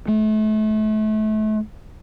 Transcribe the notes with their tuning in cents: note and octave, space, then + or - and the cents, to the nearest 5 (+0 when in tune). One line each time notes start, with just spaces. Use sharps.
A3 -35